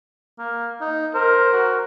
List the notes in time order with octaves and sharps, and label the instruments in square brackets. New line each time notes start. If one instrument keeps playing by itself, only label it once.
[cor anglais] A#3
D#4
[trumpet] A#4 [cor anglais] C5
[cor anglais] F#4